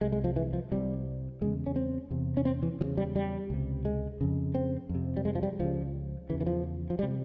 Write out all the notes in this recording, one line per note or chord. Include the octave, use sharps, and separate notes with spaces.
C2 C3 G#3
G#3
F3
E3
F3
C2 C3 G3
E2 C#3 G#3
C#4
C4
E2 C3
C#4
C4
E3
E2 C#3 F3
G3
G3
C#2 C3
G#3
F2 C#3
C4
F2
C3
G3
G#3
F3
G3
C#2 C#3 F3
E2 C#3 E3
E3
F3
F3
G3
C3